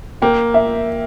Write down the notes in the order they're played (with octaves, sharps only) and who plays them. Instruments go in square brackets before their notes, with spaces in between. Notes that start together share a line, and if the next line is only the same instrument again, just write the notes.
[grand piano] A#3 [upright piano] G5
[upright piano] E5